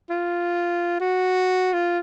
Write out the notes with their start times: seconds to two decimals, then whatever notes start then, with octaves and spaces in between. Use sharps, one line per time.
0.10 F4
1.00 F#4
1.73 F4